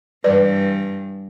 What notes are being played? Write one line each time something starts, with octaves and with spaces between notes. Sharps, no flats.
G2 E3 B4 D5